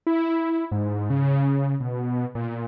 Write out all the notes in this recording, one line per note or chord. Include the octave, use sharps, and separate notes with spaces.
E4
G#2
C#3
B2
A#2